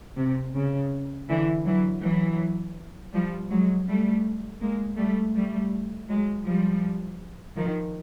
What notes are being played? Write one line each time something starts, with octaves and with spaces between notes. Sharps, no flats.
C3
C#3
D3 E3
E3 F#3
E3 F#3
F3 G3
F#3 G#3
G3 A3
G#3 A#3
G3 A3
G3 A3
F#3 G#3
F3 G3
D#3 F3